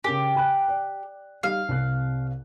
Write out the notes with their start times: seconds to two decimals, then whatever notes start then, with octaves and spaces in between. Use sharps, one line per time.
0.04 C#3 G4 A#4
0.35 G#5 B5 F#6
0.68 D5
1.43 G3 D#4 G4 F5
1.69 C2 C3 F#6